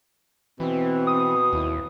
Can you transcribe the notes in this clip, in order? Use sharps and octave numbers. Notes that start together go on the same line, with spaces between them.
B2 E3 C4
D#6
D#2 E4